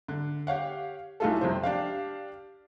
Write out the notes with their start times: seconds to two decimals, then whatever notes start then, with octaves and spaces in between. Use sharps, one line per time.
0.08 D3
0.47 G4 C#5 F5 F#5
1.20 B1 A3 E4 F4 G#4 A4
1.41 F2 C3 C5
1.63 D4 G4 F5